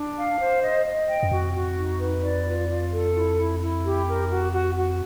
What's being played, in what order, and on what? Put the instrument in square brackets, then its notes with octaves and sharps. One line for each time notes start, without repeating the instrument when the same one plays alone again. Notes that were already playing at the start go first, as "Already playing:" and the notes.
Already playing: [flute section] D4
F5
C5
D#5
D#5
G5
[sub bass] F#2
[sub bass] F2 [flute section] F#4
[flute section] F#4
D#4
B4
D5
F4
F4
A4
E4
E4
E4
G4
A#4
F#4
F#4
F#4